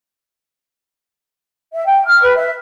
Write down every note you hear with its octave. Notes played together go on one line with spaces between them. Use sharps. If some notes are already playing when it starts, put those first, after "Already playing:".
E5
G5
F6
B4
E5